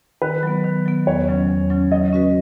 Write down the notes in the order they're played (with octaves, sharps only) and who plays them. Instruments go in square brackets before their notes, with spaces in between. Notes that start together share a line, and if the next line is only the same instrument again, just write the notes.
[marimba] D#3 [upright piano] B4
[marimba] F#3 B3
D#3
F#3 B3
[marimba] E2 [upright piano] C#5
[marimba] C#3 F#3 C#4
E2
C#3 F#3 C#4
[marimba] F#3 [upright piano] D#5
[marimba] C#4 F#4 B4